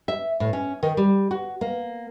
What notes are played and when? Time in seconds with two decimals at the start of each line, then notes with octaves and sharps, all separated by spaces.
0.08 E5
0.40 A2
0.53 C#4
0.83 D#3
0.97 G3
1.31 F#4
1.61 A#3